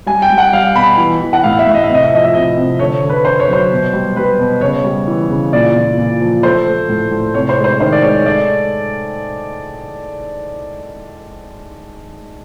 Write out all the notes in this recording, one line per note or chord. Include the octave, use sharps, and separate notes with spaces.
G3 G#5
G5
G3
F#5
G3 F5
B2 B5
E3
E3
F#5
A2 F5
E5
A2
D#5
E5
C3
D#5
E5
F3 D#5
E5
C3 D#5
C3
D3 C#5
D3
B4
D3 C5
C#5
F#3
C5
B2
G3
G3 B4
B2
C#3 C#5
G3
E3
C#3
A#2 D5
A#2
A#2
F3
A3 C5
A3
A2
A2
C3 C#5
C5
G#3
C5
D#3 C5
D5
G#3 C#5
A3 D5